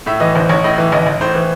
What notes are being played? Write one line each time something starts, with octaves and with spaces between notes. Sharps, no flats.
A2 E5
E3 D#5
A1 C5
A1 C#5
A2 D#5
E3
A1 D#5
A1
A2 C5
E3